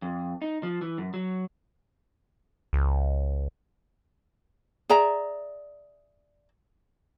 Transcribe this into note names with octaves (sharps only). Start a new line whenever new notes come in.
F2
D#4
F3
E3
F#2
F#3
C#2
G#4 D5 E5 A#5